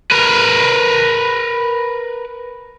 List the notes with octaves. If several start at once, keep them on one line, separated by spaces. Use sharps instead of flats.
A#4 B4